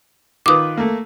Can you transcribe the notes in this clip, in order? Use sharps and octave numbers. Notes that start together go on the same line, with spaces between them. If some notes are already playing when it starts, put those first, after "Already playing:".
D#3 F4 B4 D6 D#6
A3 A#3